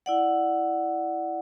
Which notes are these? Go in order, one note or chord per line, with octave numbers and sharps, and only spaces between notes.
E4 D5 F#5